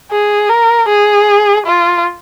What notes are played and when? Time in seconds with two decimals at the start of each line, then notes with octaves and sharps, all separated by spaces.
0.11 G#4
0.49 A#4
0.88 G#4
1.66 F4